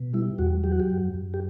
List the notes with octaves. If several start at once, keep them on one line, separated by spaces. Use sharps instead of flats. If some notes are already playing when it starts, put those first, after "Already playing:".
Already playing: B2
G3 E4
E2 F#4
F#3 G4
F#4
G4
F#2
F#2
G4